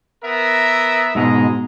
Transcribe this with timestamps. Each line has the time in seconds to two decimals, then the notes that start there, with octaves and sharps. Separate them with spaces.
0.23 B3 A#4 E5
1.15 G#2 B2 G#3 A#5